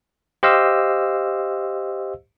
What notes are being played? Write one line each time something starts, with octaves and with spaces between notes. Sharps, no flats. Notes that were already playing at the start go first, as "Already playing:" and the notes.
G4 C5 D#5 F5 E6